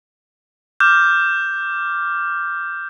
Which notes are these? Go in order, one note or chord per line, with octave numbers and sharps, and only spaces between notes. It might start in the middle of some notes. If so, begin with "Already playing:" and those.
D6 F6 G6